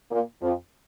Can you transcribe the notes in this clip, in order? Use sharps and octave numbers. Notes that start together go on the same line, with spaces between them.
A#2 A#3
F2 F3